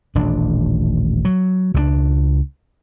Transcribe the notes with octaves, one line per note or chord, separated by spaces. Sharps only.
D#1 A1 D4
F#3
C#2 F#3 D4